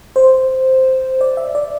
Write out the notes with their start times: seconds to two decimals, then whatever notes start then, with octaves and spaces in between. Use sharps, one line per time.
0.16 C5
1.21 D5
1.37 E5
1.55 D5